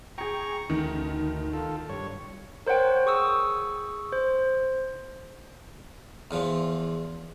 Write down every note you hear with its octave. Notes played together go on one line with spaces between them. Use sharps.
G#4 G5 A#5 C#6
D2 D#3
F4 A4
G2 C#5
A#4 C5 C#5 F#5 G5
G#4 C#6 D#6 E6
C5
E2 E3 F3